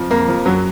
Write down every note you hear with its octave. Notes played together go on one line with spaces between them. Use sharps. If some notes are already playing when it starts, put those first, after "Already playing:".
Already playing: F2 F3
F2 A#3
F3
F#2 F#3